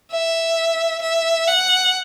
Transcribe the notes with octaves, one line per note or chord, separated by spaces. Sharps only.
E5
E5
F#5